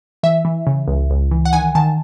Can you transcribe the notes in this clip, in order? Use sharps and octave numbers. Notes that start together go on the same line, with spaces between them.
E3 E5
E3
C#3
C#2
C#2
E3
F#5
D#3 G#5
D#3 A5